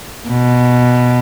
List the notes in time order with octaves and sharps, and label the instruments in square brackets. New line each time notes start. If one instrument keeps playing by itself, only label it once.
[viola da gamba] B2